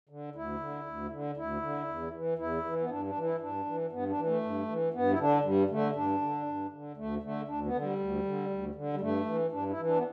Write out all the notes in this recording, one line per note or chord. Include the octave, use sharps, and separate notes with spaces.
D3
D2 E4
D3
D2
D3
D2 E4
D3
E2
E3
E2 E4
E3
B3
G2 D4
D4
E3
E4
G2 D4
E3
G2 B3
D4
E3
A3
G2
E3
G2 B3
E4
D3 D4
G2 G3
D3 A3
G2 D4
D3
G2
D3
D2 A3
D3 A3
D2 D4
B3
D3
G3
D2
D3
D2
D3
G3
G2 A3
E3
G2 D4
E4
E3
D4
B3